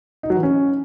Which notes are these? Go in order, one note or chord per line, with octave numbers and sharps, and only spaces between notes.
D#4
F#3
E3
C#4